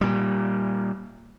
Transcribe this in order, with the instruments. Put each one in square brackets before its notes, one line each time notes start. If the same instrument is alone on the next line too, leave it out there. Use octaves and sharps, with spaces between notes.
[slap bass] A#2 G3